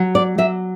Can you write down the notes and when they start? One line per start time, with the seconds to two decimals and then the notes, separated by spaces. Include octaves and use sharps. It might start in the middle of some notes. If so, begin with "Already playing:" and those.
Already playing: F#3
0.15 D5
0.38 F#3 E5